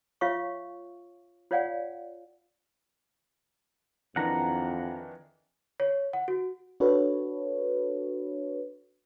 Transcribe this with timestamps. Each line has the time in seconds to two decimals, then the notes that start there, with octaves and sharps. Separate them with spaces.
0.21 F4 C#5 E5 F5 C#6
1.51 F4 C#5 D5 F5 F#5 G#5
4.16 F2 D#3 E3 D4 F#5 A#5
5.80 C#5
6.13 F#5
6.28 F#4
6.80 D4 F#4 A4 B4 C#5